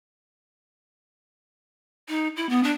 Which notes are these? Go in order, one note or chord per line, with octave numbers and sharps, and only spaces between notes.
D#4
E4
B3
D4